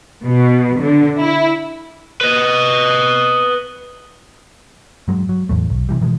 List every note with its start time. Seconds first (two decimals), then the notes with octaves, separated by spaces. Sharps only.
0.24 B2
0.81 D3
1.19 E4
2.21 B4 D#5
5.08 G2 F#3 G#3
5.29 F#3
5.49 E2 A2 A3
5.70 B1
5.89 C3 D#3 E3 G3
6.01 B2 E3 F3 G#3